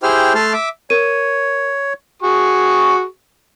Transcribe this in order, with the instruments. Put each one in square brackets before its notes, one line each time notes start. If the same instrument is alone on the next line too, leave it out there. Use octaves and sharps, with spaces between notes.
[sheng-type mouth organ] E4 G4 G#4 C5 G5 F6
A3 A5 C6 F6
E5 D6
[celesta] A#4 D#7 [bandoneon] C#5
[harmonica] F#4 G#4 C#6